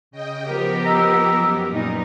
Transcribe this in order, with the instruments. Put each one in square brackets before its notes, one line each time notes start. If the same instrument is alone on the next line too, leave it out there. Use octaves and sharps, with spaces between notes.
[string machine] C#3 D#5 G5
[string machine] F3 A#4 [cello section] B3 G4
[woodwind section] D#5 A#5 E6
[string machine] F#2
[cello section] A#2 B3 D#4